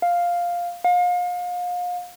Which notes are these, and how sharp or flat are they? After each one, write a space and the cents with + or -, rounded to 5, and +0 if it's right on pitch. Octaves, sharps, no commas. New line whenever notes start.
F5 +0
F5 +35